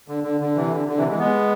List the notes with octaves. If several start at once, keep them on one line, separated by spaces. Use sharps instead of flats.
D3
D3
D3
C3 E3
D3
D3
C3 E3
E3 G#3
G#3 B3